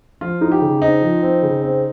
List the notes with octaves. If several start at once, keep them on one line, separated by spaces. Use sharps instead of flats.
F3 F4
D#4
G4
C#3
C4 D#4
F3
C4
C#3
C4